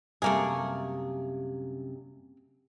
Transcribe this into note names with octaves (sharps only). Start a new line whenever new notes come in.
F#2 C3 G3 A3 A#3 G#4